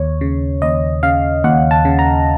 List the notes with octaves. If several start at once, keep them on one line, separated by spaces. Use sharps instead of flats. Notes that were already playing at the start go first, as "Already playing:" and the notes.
Already playing: D#2 C#5
C#3
D#2 D#5
C#3 F5
D#2 F#5
A5
C#3
A#5